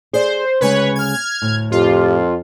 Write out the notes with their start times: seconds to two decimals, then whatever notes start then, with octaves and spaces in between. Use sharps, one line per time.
0.13 G#4 C5 D5
0.61 D2 C#3 G#3 B4 C#5
0.95 F6 G#6
1.42 D2 A2
1.72 F2 F4 G4